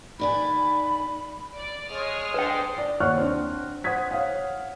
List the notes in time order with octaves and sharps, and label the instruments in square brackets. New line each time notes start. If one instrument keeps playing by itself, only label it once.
[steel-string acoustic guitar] D#3 D5 G#5 [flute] B5
[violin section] D5
[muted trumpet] G#3 [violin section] C#5 D#6 F6
[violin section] D4 C5 [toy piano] B4 G5
[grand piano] D5
D#2 C#5 F#5 C#6 F6 F#6
C4 D4
C5 F#5 D#6 G#6 B6
C#5 F5 F#5